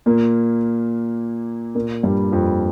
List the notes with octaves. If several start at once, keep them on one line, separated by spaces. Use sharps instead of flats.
A#2 A#3
A#2 A#3
G2 G3
F2 F3